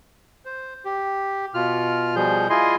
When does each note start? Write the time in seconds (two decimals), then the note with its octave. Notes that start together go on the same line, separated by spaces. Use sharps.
0.45 C5
0.85 G4
1.54 B2 F4 F6
2.16 B2 F3 G3 G#4 G6
2.50 E4 F4 G#4 D#5 G#5 C6